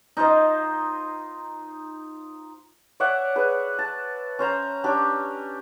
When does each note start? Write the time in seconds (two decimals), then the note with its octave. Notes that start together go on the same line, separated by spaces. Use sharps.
0.17 D#4 F4 C5 D#5
3.00 C#5 D5 E5 F#5
3.36 G#4 B4
3.79 A5
4.39 C#4 C5 A#5
4.84 C#4 D4 G4